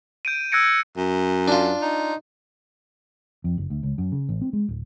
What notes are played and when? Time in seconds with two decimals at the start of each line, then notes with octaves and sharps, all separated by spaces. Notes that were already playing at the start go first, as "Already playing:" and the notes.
0.25 G6 D7 D#7
0.52 E6 F#6 G#6 A#6 C#7 D7
0.97 F#2
1.48 D4 F4
1.82 D#4
3.44 F2
3.58 F#1
3.70 D2
3.83 C#2
3.98 F#2
4.12 C#3
4.29 A1
4.41 C4
4.53 G#3
4.69 D1